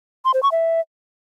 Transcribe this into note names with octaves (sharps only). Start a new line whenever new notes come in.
C6
C5
C#6
E5